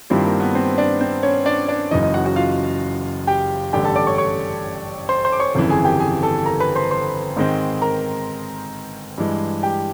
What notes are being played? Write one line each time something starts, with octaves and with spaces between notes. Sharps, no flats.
G2 D#3 G3 C4 E4 F4
A#3 A#4
B3 B4
C4 C5
D4 D5
C4 C5
C#4 C#5
D4 D5
D4 D5
F#1 F#2 C#3 E3 D#4 D#5
D#4 D#5
F#4 F#5
F#4 F#5
F4 F5
G4 G5
A1 G2 D3 G4 G5
A4 A5
D5 D6
C#5 C#6
C#5 C#6
C5 C6
C5 C6
D6
C#5 C#6
G1 F2 C#3 E3
G#4 G#5
G4 G5
G#4 G#5
A4 A5
A#4 A#5
B4 B5
C5 C6
C5 C6
G#2 D#3 G#3 C4
A#4 A#5
G2 E3 G#3
G4 G5